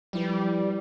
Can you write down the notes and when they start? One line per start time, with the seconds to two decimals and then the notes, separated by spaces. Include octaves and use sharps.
0.13 F3 G3 E4 B4